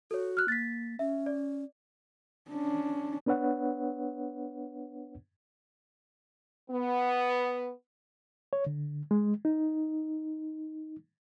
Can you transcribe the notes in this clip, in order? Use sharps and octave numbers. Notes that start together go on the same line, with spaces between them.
F#4 A4 C#5
F6 F#6
A#3 A6 B6
C#4 E5
D5
C#4 D4
B3 D4 B4 C#5 F#5
B3
C#5
D3
G#3
D#4